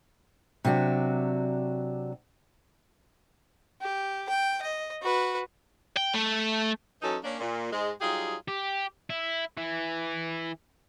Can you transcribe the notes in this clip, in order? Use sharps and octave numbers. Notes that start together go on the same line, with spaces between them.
C3 F#3 D4 F#4
G4
G5
D#5
F#4 B4
G5
A3
F#2 E3 F#3 C#4 D#4 A4
A#3 C#4 D4
A#2
G#2 G#3
F#3 G3 D#4 F4 G4 G#4
G4
E4
E3